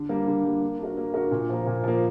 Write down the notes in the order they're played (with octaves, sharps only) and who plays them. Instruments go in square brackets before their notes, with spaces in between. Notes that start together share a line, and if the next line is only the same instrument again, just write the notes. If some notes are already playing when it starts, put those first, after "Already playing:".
Already playing: [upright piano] D3
G3 A#3
D3
G3 A#3
A#3
D4 F#4 A#4
A#3
D4 F#4 A#4
A#2
F3 A#3
A#2
F3 A#3